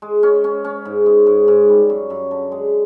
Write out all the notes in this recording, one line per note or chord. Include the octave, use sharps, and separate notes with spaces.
G#3
C#4
C#4
C#4
G#2
G#3
G#2
G#2
G3
F#2
F#2
D3
G#3